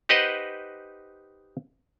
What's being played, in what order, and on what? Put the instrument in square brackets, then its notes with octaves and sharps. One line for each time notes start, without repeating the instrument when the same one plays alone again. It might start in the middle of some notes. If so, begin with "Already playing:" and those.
[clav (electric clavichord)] D#4 G4 B4 C5 D#5 F#5